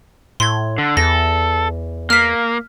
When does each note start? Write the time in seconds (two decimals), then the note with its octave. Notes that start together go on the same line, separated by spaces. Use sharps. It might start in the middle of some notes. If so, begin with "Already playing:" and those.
0.40 A2 C6 G#6
0.78 D3
0.97 E2 A4 A#6
2.10 A#3 F6 B6